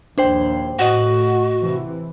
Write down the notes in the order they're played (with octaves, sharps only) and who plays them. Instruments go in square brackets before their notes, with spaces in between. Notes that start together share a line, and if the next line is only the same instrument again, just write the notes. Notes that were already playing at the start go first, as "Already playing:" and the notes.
[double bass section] A#1 D#2 [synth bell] D4 C5 G5
[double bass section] A2 [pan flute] F#4 [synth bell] D#5 F#5
[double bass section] C3 E3